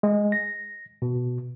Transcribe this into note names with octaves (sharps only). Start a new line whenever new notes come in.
G#3
A#6
B2